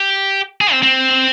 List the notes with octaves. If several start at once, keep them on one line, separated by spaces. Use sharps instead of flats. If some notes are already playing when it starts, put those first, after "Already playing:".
Already playing: G4
G#4
C4
C4